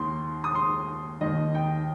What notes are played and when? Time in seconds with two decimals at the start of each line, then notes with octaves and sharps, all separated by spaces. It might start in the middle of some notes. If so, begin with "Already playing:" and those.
Already playing: D#2 D#3 C6
0.44 D#6
0.55 C6
1.21 D#2 D#3 D#5
1.55 G5